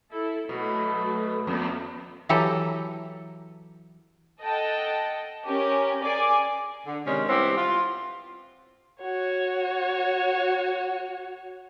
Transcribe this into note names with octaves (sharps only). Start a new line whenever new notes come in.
E4 A4
B2 F#3 A3
F2 B3
E3 F#3 E4 G4 A4 A#5
A4 D#5 F#5 G5 A5
C#4 G4 A#4 C#5
G#4 A#4 D5 G#5 D6
D3
C3 D#3 G#3 C#4 D4
G3 B3 C4 E4 G4
F4
F#4 C#5